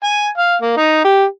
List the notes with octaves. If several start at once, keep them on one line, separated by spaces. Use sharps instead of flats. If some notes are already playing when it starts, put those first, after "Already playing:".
G#5
F5
A#3
D#4
G4